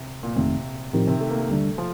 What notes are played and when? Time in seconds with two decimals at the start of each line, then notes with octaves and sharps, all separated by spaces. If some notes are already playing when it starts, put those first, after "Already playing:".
Already playing: C3
0.23 A#2
0.36 G1 F2 C3 D#3 A3 C4
0.93 A2 D#3 F3 C4 G4 A#4
1.07 C3
1.21 A3
1.31 A#3
1.40 A3
1.49 D#2 D3 G3 D4
1.78 F3